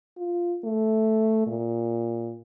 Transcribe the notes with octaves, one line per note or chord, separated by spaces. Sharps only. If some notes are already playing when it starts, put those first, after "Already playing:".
F4
A3
A#2